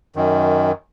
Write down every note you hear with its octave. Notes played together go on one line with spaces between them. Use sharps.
F#2 D#3